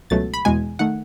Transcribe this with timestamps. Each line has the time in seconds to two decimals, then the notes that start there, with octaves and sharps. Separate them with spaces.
0.10 C#2 B2 F#3 A3 A6
0.34 B5
0.45 E2 B2 G#3 G#5
0.79 D#3 A3 F#5